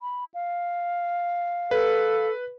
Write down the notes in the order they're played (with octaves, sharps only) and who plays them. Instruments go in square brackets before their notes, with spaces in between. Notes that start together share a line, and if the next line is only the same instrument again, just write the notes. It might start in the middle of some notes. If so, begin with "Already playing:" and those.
[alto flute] B5
F5
[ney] A4 [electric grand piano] B4